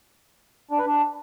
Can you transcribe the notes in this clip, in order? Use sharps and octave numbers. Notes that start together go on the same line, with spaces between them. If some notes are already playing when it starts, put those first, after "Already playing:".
D4
B4
D4